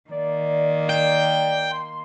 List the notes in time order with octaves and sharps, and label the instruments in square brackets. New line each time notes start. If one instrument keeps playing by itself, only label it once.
[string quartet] D#3 A#3 [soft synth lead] D5
[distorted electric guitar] G5
[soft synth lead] C6